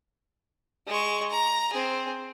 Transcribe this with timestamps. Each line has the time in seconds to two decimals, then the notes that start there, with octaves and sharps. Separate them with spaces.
0.87 G#3 C#6
1.30 A#5
1.73 C4 G#4